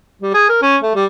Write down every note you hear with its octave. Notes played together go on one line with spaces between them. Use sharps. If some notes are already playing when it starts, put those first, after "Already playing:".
G3
G#4
A#4
C#4
A3
G3